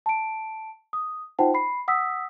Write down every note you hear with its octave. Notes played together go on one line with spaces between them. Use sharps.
A5 D7
D#6
D#4 F4 C5 F#5 G5 A5
B5 C7
F#5 D#6 E6 B6